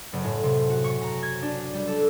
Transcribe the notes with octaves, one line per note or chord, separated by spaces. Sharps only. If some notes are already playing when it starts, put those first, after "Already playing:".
F#1
A2
C3
F#4
C#6
A#5
G#6
D4
G3
A4